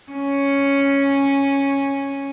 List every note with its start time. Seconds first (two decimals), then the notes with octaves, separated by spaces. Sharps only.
0.12 C#4